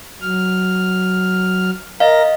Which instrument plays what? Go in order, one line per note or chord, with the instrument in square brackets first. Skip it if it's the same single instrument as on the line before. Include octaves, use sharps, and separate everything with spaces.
[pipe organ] F#3 F6
[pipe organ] A#4 A#6 [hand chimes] D#5 F5